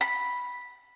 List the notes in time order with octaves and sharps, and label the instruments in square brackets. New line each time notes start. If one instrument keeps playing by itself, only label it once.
[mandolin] B5